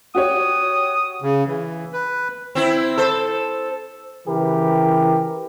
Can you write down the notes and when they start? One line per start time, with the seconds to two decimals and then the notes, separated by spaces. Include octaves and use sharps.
0.15 F#4 G4 C#5 D#6
1.22 C#3
1.46 E3
1.93 B4
2.55 C4 E4
2.97 A4 C5
4.27 C#3 E3 G4 A#4 B4